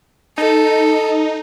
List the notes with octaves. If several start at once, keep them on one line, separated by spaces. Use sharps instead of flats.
D#4 A4